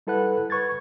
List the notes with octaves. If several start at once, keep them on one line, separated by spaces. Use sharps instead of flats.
G3 E4 A4 B4 F#5 F#6
B4 C#6 G#6 A6